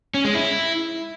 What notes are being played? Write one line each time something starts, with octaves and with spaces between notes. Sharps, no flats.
C#4
G#3
E4